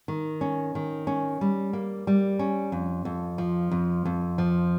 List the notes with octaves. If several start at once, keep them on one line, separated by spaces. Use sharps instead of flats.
D#3
C#4
D#3
C#4
G3
A#3
G3
C#4
F2
F2
F3
F2
F2
F3